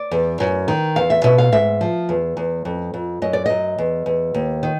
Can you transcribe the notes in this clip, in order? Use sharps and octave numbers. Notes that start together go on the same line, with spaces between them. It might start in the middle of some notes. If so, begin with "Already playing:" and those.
Already playing: D5
E2
F#2
D#3
E2 F5
E5
B2 E5
F5
G#2 E5
F3
E2
E2
F2
F2
F#2 D#5
D5
F#2 D#5
E2
E2
D#2
D#3